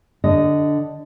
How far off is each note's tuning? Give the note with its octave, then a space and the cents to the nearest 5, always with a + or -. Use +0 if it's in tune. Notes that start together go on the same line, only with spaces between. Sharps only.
D3 +0 D#5 +0